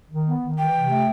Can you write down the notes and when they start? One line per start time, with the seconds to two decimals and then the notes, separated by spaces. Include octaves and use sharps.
0.10 D#3
0.26 B3
0.42 D#3
0.58 E3 G5
0.74 C3
0.90 A3